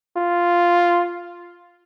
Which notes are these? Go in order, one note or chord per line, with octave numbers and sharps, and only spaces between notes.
F4